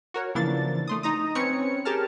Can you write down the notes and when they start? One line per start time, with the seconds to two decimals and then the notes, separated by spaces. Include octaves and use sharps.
0.14 F#4 A#4 C#5
0.35 C#3 E3 F3 A#3 D4 A6
0.88 A3 C6 D#6
1.03 D#4 A#5 D#6
1.35 C4 C#4 B4 C#5 C#7
1.85 G4 G#4 A#4 A5 F6